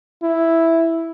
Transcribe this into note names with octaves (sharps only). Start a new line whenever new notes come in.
E4